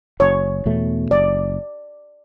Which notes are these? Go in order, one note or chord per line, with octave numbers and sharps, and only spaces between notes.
F#1 C#5
E2 B2 A3
F#1 D5